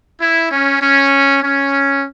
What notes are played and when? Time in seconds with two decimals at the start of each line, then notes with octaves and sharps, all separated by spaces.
0.22 E4
0.52 C#4
0.82 C#4
1.43 C#4